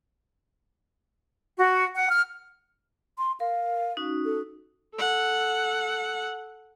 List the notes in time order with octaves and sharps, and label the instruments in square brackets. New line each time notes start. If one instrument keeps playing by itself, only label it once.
[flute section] F#4
F#5
F6
[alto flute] C6
[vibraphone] A#4 [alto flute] F5
[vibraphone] C#4 D#4 F#4
[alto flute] A4
[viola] A4 F#5